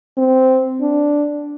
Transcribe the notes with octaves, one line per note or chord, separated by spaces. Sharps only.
C4
D4